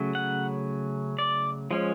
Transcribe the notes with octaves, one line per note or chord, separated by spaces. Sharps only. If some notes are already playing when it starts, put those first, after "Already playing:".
Already playing: C#3 F#3 A3 C#4
F#5
D5
F3 G#3 C#4